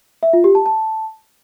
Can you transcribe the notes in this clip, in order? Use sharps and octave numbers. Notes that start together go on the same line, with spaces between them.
E5
F4
G4
A5
A5